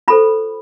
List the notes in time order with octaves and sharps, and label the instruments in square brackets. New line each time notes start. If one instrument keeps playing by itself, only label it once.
[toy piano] F4 A4 C5 B5